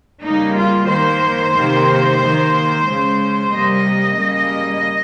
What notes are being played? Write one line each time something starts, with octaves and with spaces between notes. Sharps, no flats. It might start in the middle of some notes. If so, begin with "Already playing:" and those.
C#3 G3 A#3 D#4
F4
D#3 A#3 C5
C3 D#3 A#3
D#3 A#3
C#3 G#3
C3 G3 A#3 D#5
C#3 G3 A#3